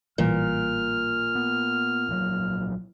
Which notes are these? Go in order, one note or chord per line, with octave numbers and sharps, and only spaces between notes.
A1 A#2 E3 G3 F6
B3
A#1 F3 F#3